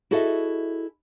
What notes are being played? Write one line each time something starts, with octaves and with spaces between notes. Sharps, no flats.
E4 F#4 G#4 A4 D#5 E5